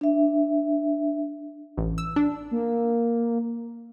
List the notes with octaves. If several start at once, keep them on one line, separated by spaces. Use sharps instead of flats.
D4 E5
A1
E6
D4
A#3